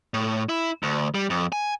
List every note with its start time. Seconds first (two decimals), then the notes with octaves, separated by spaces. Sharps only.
0.14 A2
0.49 E4
0.83 D2
1.15 G3
1.30 F2
1.52 G#5